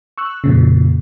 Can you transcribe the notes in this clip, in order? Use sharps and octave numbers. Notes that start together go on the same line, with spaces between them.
C#6 E6 F#6
F2 A#2 C#3